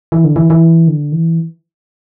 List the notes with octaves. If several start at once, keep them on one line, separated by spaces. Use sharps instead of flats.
E3
D3
E3
E3
D3
E3